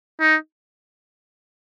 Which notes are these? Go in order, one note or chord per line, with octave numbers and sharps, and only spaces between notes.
D#4